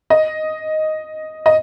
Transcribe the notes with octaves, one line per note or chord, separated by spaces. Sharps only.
D#5
D#5